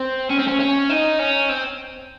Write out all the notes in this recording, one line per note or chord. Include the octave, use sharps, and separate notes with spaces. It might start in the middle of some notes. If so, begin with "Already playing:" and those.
Already playing: C4
C#4
C4
C#4
C#4
D#4
C#4
C4